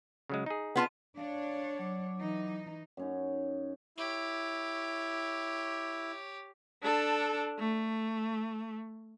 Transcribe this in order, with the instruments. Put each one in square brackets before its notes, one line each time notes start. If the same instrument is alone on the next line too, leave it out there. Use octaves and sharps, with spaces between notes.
[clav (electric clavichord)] C#3 F#3 G#3
D#4 G#4
[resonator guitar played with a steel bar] B3 F4 A5
[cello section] D4 C#5 [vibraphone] F5
[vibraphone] F#3 D6
[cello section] E3 D#4
[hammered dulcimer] F#2 C#4 D#4
[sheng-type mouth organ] E4 [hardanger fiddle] G4 C#5
[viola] D4 A4
A3